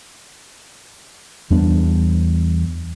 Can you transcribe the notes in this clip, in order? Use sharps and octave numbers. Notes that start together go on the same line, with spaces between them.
E2 G3 B3 D4